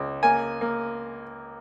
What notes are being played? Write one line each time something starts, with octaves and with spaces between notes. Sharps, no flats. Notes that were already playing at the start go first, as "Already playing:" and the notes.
Already playing: C#2
A#3 G#5
A#3